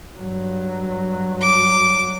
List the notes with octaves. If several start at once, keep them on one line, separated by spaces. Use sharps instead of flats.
G2 F#3
D6